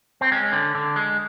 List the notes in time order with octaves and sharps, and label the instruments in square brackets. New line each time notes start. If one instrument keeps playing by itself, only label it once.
[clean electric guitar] C4
G#3 C#4
D3
D3
G#3